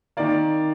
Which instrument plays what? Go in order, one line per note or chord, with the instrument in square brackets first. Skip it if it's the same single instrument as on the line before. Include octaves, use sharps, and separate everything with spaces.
[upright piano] D#3 A#3 D5